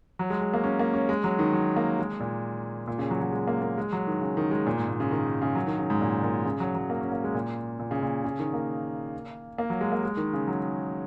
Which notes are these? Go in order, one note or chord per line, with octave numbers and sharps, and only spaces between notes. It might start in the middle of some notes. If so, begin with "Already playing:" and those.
F#3
G#3
G#3
A#3
C#4
A#3
C#4
G#3
F#3
D#3
F#3
A#3
G#3
A#2
A#2
C#3
F#3
F#3
G#3
A#3
A#3
G#3
F#3
D#3
C#3
D#3
G#3
A#2
G#2
A#2
C#3
D#3
C#3
F#3
D#3
C#3
G#2
A#2
A#2
C#3
F#3
F#3
A#3
C#4
A#3
G#3
A#2
A#2
C#3
A#2
C#3
D#3
A#3
A#3
F#3
G#3
A#3
G#3
D#3
C#3
F#3